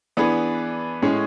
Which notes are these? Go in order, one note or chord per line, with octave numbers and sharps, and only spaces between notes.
E3 B3 D4 G#4 B4
A2 G#3 C#4 G#4